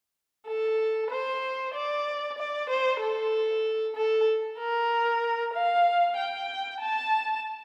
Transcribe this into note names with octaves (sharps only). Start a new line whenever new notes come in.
A4
C5
D5
D5
C5
A4
A4
A#4
F5
G5
A5